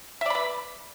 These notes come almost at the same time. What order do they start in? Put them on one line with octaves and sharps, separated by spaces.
E5 D5 B5 B4